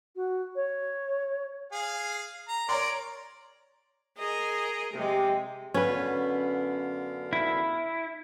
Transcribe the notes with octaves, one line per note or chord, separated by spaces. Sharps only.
F#4
C#5
G#4 F5 G#5
A#5
A#4 C#5 D5 A#5 C6
G#4 A#4 D#5
C3 G#3 G4
F#2 D3 B3 C#4 B4 F5
E4